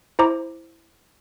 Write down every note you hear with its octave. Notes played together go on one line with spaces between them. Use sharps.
E4 C5 A#5 D6